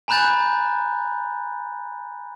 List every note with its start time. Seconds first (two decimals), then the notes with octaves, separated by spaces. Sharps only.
0.08 G#5 A#5 B5 F#6 G6 A6